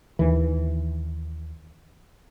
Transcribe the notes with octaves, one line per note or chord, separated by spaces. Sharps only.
D#2 E3